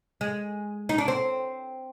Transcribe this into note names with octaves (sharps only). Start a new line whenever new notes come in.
G#3
D#4
D4
C4